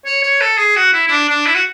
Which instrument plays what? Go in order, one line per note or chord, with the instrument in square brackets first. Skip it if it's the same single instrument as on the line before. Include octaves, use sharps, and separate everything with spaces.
[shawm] C#5
C#5
A4
G#4
F#4
E4
E4
D4
D4
E4
F#4